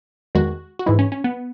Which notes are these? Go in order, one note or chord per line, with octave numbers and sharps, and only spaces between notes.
E2 D#3 G#3 F#4
F#4
G#2 E3 G#3 E4
C#4
C#4
B3